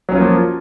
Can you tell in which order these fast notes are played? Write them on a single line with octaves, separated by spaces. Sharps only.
F#3 C#4 F4 A#3 F3